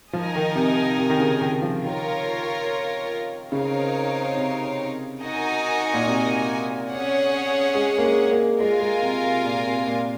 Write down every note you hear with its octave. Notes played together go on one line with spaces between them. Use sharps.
F3 D#4 A#4 D#5 G#5
D#3
C3
C3
D#3
C#3
D#3
F3
D#3 F4 A#4 C#5
C#3 C4 D#4 A#4 C#5 F5
C3
D#4 F#4 A#4 D#5 G#5
A#2
C3
C#4 G#4 C#5 F#5
G#3
A#3
G#3
A#3
G#3 F4 A#4 F5 G#5
G#3
C3
C3
A#2
C3
A#2